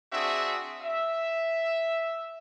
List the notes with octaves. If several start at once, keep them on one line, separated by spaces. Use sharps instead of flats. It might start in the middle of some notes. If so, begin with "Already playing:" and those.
C4 D4 F#4 G#4 E5
E5